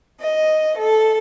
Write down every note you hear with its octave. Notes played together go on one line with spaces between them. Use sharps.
D#5
A4